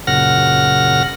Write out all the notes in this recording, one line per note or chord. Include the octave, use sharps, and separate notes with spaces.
F#2 A#2 C#3 F#5 F6 A#6